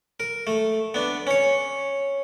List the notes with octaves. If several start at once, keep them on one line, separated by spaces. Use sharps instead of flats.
A#4
A3
B3 D4
C#4 C#5